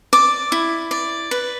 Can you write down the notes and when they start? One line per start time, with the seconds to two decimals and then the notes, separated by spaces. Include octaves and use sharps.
0.13 D5 D6
0.52 E4
0.91 D5
1.31 B4